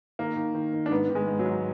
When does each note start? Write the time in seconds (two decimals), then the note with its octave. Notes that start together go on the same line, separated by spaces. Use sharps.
0.19 D#3 A#3
0.36 D#3
0.54 D#3
0.73 D#3
0.86 D4
0.91 G#2 B3
1.10 D#3
1.15 G#3
1.27 G#2
1.39 F#3
1.46 G#2